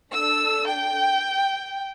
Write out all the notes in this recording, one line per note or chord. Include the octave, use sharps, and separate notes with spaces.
D4 A4 E6
G5